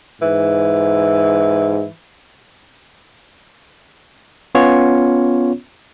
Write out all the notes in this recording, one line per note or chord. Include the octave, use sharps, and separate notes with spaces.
G#2 E3
B3 C#4 F4 C#5